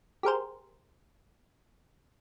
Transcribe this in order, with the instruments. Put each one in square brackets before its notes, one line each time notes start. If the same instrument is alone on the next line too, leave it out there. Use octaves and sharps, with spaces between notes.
[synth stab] G4 G#4 A#4 C5